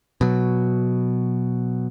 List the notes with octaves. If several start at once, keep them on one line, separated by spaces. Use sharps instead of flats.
B2 F#3